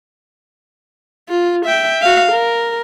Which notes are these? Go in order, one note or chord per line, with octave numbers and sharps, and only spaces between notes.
F4
E5 G5
F#4 F5
A#4